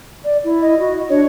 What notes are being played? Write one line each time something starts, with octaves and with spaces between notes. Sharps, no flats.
D5
E4
D#5
F#4
D4 C#5